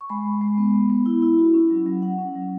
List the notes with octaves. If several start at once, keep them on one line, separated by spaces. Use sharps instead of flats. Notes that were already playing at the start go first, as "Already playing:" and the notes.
C#6
G#3 B5
G#3
G#3
B3
B3
B3
E4
E4
F#4
C#4
F#3
F#3
C#4 F#5
C#4
F#3